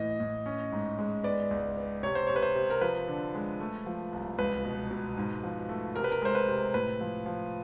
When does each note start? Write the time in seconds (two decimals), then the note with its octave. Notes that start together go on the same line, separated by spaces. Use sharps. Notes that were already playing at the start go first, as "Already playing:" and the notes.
Already playing: A2 E3 D#5
0.20 A2
0.46 C#4
0.72 G#2
0.98 G#3
1.24 B3 D5
1.51 C#2
1.77 B3
2.03 C3 C#5
2.15 C5
2.27 C3 C#5
2.36 B4
2.42 C5
2.55 C3
2.70 A#4
2.81 F3 B4
3.08 D3
3.35 G#3
3.60 A3
3.86 F3
4.13 C2
4.38 C#2 B4
4.65 B2
4.91 B2
5.17 G#2
5.43 F3
5.69 A3
5.95 C3 A#4
6.04 B4
6.12 A#4
6.22 G#3 C5
6.35 B4
6.48 C3
6.74 A2 B4
7.01 F3
7.26 F3